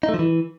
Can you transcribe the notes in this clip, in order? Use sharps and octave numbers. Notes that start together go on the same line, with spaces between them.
D#4
A3
F3
E3